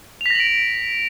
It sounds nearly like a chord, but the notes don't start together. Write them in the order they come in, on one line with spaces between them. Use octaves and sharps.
F7 B6 A#6 F#7 D7